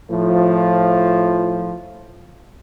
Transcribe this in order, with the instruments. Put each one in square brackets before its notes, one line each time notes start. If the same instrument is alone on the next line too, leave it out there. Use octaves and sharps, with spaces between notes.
[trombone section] A2 F3